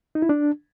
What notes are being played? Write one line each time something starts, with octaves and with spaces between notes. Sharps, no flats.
D#4
E4
D4